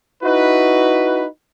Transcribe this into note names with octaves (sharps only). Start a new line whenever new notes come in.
D#4 E4 F#4 B4